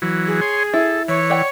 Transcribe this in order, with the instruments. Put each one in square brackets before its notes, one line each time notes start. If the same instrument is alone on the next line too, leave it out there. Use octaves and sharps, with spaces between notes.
[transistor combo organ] E3 F#3
[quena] G#4
[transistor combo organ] C#5 G#5 C6
[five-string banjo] E4 [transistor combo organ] A4
[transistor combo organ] E3 [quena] C#5
[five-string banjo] D5 F#5 G5